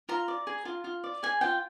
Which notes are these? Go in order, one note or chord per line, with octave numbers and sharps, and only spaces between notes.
F4 A#5
D5
G#4
F4
F4
D5
G#4 G#5
F4 G5